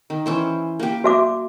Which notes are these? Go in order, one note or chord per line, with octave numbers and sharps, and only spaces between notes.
D#3
E3 C#4 C5
A#3 G4
F#4 E5 D6